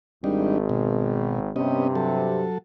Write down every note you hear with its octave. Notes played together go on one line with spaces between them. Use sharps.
G#1 G3 D4 D#4
B2
G2 C3 B3 C#4 D#5
F#3 A4